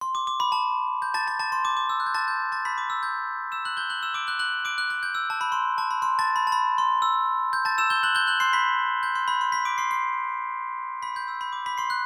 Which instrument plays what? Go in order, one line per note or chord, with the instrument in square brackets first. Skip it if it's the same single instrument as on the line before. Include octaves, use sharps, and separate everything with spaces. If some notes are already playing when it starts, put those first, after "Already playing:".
[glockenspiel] C6
D6
D6
B5
A5
G6
A5 A6
A5 A6
A5 A6
C6
D6
D6
E6
F#6
G6
A5 A6
G6
A5 A6
B5 B6
D6
E6
G6
E6 E7
F#6 F#7
G6 G7
F#6 F#7
E6 E7
D6 D7
F#6 F#7
F#6 F#7
D6 D7
F#6
F#6
G6
E6
A5
B5
C6
A5
B5
C6
A5 A6
B5
A5
B5
C6
E6
G6
A5 A6
E6 E7
G6 G7
F#6 F#7
G6 G7
F#6 F#7
C6 C7
B5 B6
G6
C6
B5
C6
B5 B6
D6 D7
C6 C7
C6 C7
B5 B6
G6
E6
B5
D6
B5 B6
C6 C7
F#6